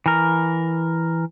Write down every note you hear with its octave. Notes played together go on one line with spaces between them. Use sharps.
E3 A#4